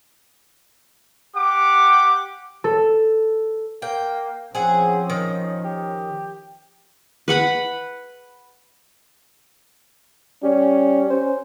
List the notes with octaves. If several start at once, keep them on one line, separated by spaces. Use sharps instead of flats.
G4 F#5 D6
A4
A#3 G5
F3 C4 C#4 G#4 F#5
D#3
G4
B4 F#5 B5
G3 C#4
C#4 C5